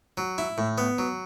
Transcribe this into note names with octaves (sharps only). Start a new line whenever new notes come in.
F#3
E4
A2
B3
F#3